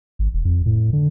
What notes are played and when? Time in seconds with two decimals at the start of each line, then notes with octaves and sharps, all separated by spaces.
0.19 G#1
0.34 E1
0.45 F2
0.66 A2
0.93 D3